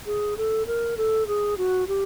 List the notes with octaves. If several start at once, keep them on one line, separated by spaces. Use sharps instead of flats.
G#4
A4
A#4
A4
G#4
F#4
G4